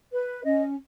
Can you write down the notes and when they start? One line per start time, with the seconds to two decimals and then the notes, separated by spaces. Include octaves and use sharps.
0.12 B4
0.44 C#4 D#5